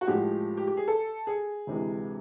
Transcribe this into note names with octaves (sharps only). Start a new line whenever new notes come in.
F#4
A2 F3 G#3 G4
G4
G4
G#4
A4
G#4
D2 C3 E3 G#3